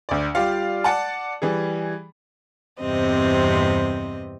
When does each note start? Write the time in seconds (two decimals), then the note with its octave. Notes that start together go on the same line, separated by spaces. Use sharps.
0.09 D2 D5
0.35 G3 F4 G4 D5 F5
0.84 D5 F#5 A5
1.42 E3 G3 G#4
2.79 E2 G2 C3 C4 D#5